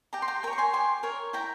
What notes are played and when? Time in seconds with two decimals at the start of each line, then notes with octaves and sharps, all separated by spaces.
0.13 G4 G5 A#5
0.22 C6
0.28 G5 A#5
0.43 A#4 G5 A#5
0.48 C#5
0.53 C#6
0.58 G#5 C6
0.73 G4 G#5 C6
1.03 A#4 C#5
1.33 E4 G5 A#5